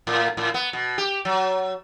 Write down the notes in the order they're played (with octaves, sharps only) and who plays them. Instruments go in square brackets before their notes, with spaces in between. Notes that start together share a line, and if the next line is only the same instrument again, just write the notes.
[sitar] A2
A2
B3
B2
G4
F#3